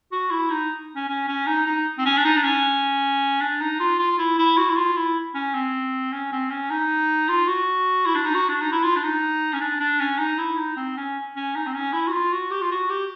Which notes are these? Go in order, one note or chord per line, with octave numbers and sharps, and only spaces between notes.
F#4
E4
D#4
C#4
C#4
C#4
D#4
D#4
C4
C#4
D4
D#4
D4
C#4
D4
D#4
F4
F4
E4
E4
F#4
E4
F4
E4
C#4
C4
C#4
C4
C#4
D#4
F4
F#4
E4
D4
D#4
F#4
D4
D#4
E4
F4
D4
D#4
C#4
D4
D4
C#4
D#4
E4
D#4
C4
C#4
C#4
D#4
C4
C#4
E4
F#4
F4
F#4
G4
F4
F#4
G4